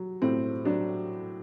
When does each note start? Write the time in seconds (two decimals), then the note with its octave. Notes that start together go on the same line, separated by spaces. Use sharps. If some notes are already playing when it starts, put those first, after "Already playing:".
Already playing: F#3
0.22 A2 C4
0.65 F#3 D4